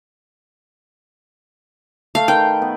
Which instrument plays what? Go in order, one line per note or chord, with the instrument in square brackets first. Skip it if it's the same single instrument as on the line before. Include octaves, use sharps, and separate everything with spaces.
[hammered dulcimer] A3 [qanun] F5
[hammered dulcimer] D#3 B4 [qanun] G5
[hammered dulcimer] B3